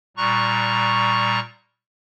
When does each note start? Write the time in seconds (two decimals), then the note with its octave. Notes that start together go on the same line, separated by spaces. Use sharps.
0.17 A#2 G3 A#5 C#6 F#6